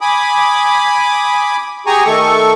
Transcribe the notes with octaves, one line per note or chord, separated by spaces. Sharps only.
G#5 B5 D6 D#6
G4 G#4 G#5 A#5 C#6 D#6
D#3 A3 A4 C#6